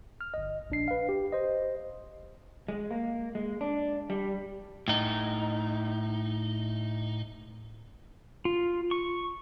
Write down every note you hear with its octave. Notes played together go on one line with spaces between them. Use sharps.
F6
G1 D#5
A#1 D4 C7
B4 F5
G4
C5 D#5
G#3
A#3
G#3
D4
G3
A2 D#4
F4
C#6